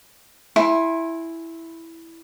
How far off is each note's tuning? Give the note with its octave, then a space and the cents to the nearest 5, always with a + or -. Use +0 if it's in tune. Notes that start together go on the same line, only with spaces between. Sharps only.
E4 +0 G#5 +0 C6 +30